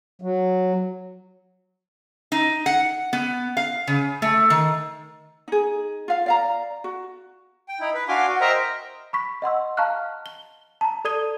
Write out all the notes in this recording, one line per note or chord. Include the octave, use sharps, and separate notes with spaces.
F#3
D#4
F#5
B3
F5
C#3
A3
D#3
D#4 G#4
F4 F5
D5 F5 A#5
F#4
G5
D#4 E4
B4
D4 F#4 F5 G#5 C6 D6
F#4
A#4 C5 D#5 E5 G5 A#5
B5 C#6 B6
D#5 F#5 C6 E6
F5 A5 A#5 C#6 F6 F#6
G7
A5 A#5
A4 D5 D#6 G#6 D#7 G7